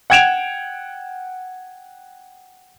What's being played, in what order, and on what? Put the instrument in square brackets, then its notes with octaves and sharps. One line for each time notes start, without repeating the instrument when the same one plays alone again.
[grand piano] F#5 G5 G#6 D7 E7 F7